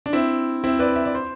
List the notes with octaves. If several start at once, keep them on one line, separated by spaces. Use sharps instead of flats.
D4
C4 E4
C4 E4
B4 D5
E5
D5
C5